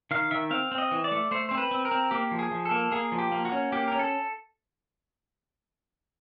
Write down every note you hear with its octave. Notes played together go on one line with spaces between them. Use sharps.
D#3 F5
D#3 E5
C4 F5
C4
D#5
E3
D5
A3
A3 C5
C4 C5
B4
C4
A#4
C4
A#3 G4
F3
G#4
F3
A4
A#3
A#3 G#4
F3
G4
A#3
F#4
C#4
A#3 G4
C#4 A#4
A4